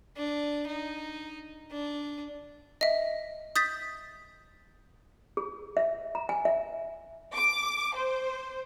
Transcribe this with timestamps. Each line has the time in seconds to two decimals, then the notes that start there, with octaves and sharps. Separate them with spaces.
0.17 D4
0.67 D#4
1.71 D4
2.81 D#5 E5
3.56 D#6 G6 A6 B6
5.37 G#4
5.77 E5
6.15 A#5
6.29 G#5
6.45 E5
7.34 D6
7.95 C5